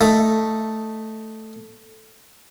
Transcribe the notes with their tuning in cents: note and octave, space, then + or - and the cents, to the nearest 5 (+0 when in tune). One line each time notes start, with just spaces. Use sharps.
A3 +0 D#4 +0